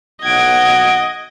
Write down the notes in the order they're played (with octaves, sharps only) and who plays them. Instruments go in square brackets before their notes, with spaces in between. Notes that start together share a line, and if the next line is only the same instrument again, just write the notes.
[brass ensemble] B1 F#5 [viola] D#5 [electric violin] G#6 D7